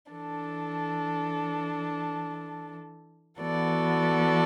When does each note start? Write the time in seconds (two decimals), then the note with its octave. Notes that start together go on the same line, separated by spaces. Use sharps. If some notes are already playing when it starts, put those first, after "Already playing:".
0.11 E3 D4 A4
3.40 E3 B3 F#4 A4 D5